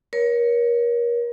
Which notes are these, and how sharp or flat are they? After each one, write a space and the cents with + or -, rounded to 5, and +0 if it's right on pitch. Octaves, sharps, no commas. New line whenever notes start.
A#4 +30 C#5 +10